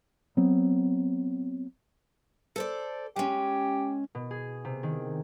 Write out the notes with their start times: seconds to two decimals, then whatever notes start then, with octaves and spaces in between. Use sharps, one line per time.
0.37 F#3 B3 C4
2.56 A4 C5 D5
3.16 G#3 C#4 G4
4.15 B2
4.31 G#4
4.65 C3
4.83 D#3